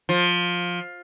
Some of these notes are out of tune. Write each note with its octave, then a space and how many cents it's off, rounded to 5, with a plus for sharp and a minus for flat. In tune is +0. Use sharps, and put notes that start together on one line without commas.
F3 +15